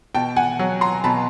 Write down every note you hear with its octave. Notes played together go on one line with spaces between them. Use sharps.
B2 G5 A5
F#5 G#5
F#3
A#5 C6
B2 A5 B5